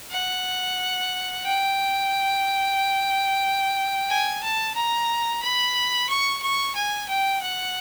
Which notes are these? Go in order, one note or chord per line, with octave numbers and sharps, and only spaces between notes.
F#5
G5
G#5
A5
A#5
B5
C#6
C#6
G#5
G5
F#5